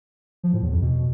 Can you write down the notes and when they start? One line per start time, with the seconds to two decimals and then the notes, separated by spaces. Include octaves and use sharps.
0.44 F3
0.53 A2
0.63 E2
0.72 F2
0.82 B2